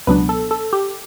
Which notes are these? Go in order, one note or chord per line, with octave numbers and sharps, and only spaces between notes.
C#2 B2 F#3 B3 D4 B4
A4
A4
G4